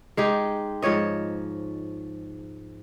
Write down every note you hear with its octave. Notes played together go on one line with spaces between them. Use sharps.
G#3 D#4 G4
G#2 F3 C#5 D#5